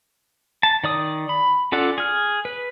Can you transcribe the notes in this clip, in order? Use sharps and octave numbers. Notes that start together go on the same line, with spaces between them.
A5
D#3 D5 D#6
B5
C#4 F4 A4 D5 F#5
G#4 F6
B4